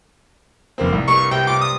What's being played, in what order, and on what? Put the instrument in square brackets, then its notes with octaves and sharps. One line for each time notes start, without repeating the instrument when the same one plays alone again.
[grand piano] F1 A#3 C4
C2
[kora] G2 A#3 [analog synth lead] C#6
[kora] C3 [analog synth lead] G5
[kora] F4 [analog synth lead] D6
[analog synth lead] D#6